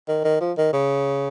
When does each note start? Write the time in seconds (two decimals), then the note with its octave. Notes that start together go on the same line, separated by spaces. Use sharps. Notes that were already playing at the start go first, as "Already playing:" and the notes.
0.08 D#3
0.24 D#3
0.41 F3
0.57 D#3
0.73 C#3